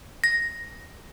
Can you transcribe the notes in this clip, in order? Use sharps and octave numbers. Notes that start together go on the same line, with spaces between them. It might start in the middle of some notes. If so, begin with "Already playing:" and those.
A#6